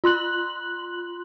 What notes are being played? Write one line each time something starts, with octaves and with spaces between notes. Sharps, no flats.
F4 C6 F#6 F#7